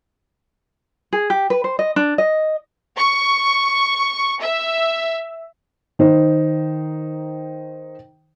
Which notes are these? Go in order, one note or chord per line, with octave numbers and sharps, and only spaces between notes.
G#4
G4
B4
C5
D#5
D4
D#5
C#6
E5
D#3 D#4 C5